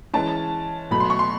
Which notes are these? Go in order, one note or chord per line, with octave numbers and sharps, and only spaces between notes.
E3 G#3 C#4 A5
B2 F#3 A3 B5
C6
C#6
C6